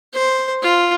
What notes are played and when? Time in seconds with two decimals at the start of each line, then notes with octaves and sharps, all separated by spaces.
0.14 C5
0.62 F4